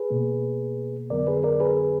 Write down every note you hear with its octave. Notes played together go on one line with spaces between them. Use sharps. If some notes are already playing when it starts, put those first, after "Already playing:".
Already playing: G#4 B4
B2 A#3
F2 D3 F#3 B3 A#4 D5
G#4 B4
A#4 D5
G#4 B4